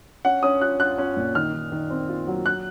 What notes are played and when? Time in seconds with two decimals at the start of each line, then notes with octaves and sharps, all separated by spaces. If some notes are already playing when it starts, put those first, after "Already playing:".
0.25 C#4 F#5
0.43 C#4 D#6
0.61 F4 F#6
0.80 F4 F#6
0.98 C#4
1.17 A#2
1.35 D#3 F6
1.53 D#3
1.72 D#3
1.91 C4
2.09 F4
2.27 F#3
2.46 F#6